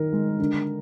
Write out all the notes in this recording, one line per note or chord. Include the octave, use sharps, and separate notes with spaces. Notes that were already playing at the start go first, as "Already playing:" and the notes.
Already playing: D#3 A#4
G#3
D3